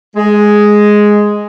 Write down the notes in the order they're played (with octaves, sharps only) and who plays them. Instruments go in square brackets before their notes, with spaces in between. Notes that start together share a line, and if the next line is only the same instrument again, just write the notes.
[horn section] G#3